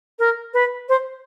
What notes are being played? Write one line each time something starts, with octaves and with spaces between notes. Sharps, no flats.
A#4
B4
C5